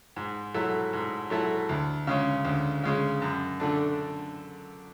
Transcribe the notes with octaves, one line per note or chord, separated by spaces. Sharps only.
G#2
F#3 A3 E4 A4
G#2
F#3 A3 E4 A4
D2
C#3 G#3 C#4
D2
C#3 G#3 C#4
F#2
D3 A3 D4